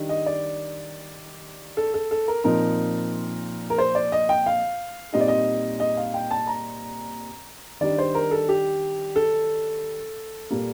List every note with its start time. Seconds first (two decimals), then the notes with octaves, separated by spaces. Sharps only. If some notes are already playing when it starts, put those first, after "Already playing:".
Already playing: D#3 G3 D4
0.09 D#5
0.26 D5
1.77 A4
1.94 A4
2.11 A4
2.28 A#4
2.44 A#2 F3 C4 D#4 A#4
3.70 A#4
3.78 C5
3.95 D5
4.12 D#5
4.29 G5
4.46 F5
5.13 A#2 G3 C4 D#4 D#5
5.20 D5
5.28 D#5
5.80 D#5
5.97 F5
6.14 G5
6.31 A5
6.47 A#5
7.81 D#3 G3 D4 D5
7.98 C5
8.15 A#4
8.31 A4
8.49 G4
9.16 A4
10.51 A#2 G3 A#3